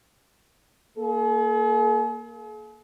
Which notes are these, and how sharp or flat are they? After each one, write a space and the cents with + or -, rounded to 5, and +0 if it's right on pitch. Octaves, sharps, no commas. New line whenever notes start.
A#3 +0 G#4 +45